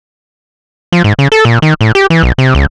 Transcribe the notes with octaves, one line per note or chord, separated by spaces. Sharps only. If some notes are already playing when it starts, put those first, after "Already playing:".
F3
G#2
C#3
A4
A#2
D#3
A2
G4
E3
B1
C3
C#2